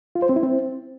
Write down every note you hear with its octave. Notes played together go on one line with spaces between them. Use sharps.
F4
C5
C4
E4
C4